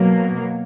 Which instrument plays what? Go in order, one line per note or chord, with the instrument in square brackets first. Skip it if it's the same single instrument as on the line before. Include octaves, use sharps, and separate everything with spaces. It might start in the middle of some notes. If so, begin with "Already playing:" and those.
Already playing: [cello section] B2 F#3 A#3